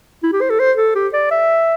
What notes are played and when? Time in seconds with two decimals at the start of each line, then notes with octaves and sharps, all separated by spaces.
0.23 E4
0.32 G4
0.41 C5
0.50 A4
0.59 C5
0.77 A4
0.95 G4
1.13 D5
1.31 E5